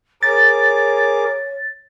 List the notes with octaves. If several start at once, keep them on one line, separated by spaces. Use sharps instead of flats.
G#4 A#4 C#5 D6 A6